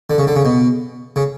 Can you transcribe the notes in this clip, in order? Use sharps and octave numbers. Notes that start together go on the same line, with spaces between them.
D3
C#3
D3
C#3
B2
C#3